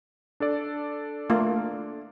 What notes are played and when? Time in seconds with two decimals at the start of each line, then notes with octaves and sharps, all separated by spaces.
0.40 D4 A4 D5
1.30 A3 A#3 F4